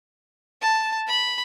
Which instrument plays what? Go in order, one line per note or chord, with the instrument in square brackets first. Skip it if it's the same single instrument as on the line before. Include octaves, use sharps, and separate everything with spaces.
[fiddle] A5
B5